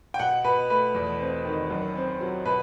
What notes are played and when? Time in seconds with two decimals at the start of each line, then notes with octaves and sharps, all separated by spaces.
0.14 G5
0.19 B2 F#5
0.44 B2 B4
0.70 A3 B4
0.95 E2
1.20 C4
1.45 D#3
1.70 F#2
1.96 C4
2.21 F#3
2.46 B2 B4